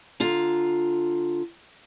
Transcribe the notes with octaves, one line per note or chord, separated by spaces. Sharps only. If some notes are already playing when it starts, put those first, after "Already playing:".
D3 F4 A#5